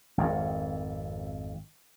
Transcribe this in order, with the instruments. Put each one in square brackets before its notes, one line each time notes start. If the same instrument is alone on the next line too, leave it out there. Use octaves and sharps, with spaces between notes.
[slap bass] G#1 F2